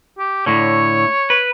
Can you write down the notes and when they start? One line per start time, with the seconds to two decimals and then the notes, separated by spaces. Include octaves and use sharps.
0.19 G4
0.46 A2 D3 C#5
1.30 B4